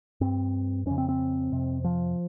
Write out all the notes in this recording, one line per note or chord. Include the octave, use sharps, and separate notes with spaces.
G2 C4
F2 C#3 C#4
C4
C4
F2 C3
F3